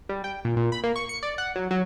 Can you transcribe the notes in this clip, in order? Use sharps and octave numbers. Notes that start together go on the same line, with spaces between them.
G3
G5
A#2
A#2
B5
A#3
C#6
C#7
D5
F#5
F#3
F#3